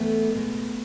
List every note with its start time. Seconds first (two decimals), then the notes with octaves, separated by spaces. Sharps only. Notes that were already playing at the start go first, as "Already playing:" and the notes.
Already playing: E2 A3 B3
0.35 B2 G#3